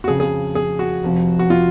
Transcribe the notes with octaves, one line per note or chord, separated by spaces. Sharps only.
F#4
F2 C#3 F3 G#4
G#4
G#4
F#4
F1 F2 F3
F#4
F4